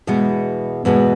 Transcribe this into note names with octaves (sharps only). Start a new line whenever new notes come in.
E2 B2 G#3 B3
E2 B2 G#3 B3